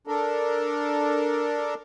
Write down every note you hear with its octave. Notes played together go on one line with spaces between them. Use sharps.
D4 A4 A#4